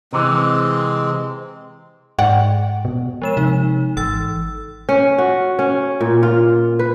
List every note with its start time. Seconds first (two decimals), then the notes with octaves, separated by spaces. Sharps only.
0.13 C3 E3 G#3 C4
2.19 G#2 D5 F#5 G5
2.85 B2
3.22 F3 G#3 E7
3.37 C3 D#4
3.97 G#1 E3 E6 A6
4.89 C#4
5.18 F#4
5.59 C#4
6.01 A#2
6.23 F4
6.79 B4